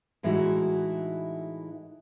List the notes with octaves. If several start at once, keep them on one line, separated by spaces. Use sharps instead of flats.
A2 E3 G#3 D#4 E4 F#4